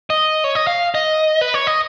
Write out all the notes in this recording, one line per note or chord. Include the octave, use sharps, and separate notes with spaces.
D#5
C#5
D#5
F5
D#5
B4
C#5
D#5